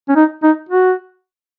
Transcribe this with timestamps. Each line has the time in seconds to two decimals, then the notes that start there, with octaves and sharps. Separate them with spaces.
0.09 C#4
0.16 D#4
0.43 D#4
0.69 F#4